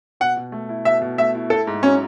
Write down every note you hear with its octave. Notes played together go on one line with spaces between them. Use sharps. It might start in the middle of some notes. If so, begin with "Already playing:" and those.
B2 F#5
B2
A3
E4
B2 E5
B2
A3 E5
E4
E4 A4
G#2
F#3 C#4